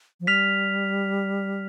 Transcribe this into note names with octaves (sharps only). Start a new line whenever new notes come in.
F3
G3 F6 B6 F7